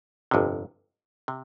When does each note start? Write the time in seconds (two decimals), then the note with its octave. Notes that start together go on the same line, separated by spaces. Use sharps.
0.31 G1 F2 C3
1.28 C3